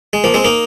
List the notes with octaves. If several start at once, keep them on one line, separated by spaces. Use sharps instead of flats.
G#3
F3 A#3
G#3 C4
A#3 D#4